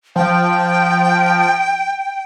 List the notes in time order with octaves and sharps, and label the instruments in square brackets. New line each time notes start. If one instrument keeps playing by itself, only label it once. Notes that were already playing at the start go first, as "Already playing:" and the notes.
[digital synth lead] F3 [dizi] G5